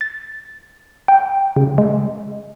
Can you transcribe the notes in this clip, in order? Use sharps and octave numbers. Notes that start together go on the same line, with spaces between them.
A6
G5
C#3
G#3